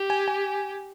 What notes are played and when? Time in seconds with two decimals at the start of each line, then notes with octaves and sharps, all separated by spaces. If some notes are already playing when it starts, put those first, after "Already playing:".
Already playing: G4
0.10 G#5
0.28 G#5